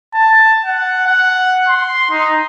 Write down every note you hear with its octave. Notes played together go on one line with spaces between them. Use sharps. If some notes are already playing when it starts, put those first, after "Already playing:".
A5
F#5
F#5
C6
D#4